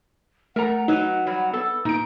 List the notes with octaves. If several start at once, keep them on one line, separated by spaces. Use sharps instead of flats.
A3 A#4 F#5 A#5
F#3 D#4 B4
F#3 G3
B3 A4
A#2 D#4 D7